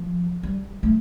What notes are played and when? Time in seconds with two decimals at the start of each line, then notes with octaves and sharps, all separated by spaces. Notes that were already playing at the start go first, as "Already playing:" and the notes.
Already playing: F3
0.43 G3
0.83 A3